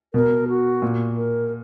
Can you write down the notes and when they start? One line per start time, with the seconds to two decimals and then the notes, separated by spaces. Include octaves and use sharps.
0.14 B2 A#4
0.49 F#4
0.82 A#2
1.16 A#4